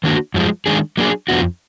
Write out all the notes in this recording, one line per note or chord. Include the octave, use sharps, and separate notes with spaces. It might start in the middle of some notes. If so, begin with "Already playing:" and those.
D#3 A#3 D4 F#4
F#2 F3 G#3
D#3 G#3 D4 G#4
F#3 A#3 D4 G#4
F2 F3 B3 D4 F#4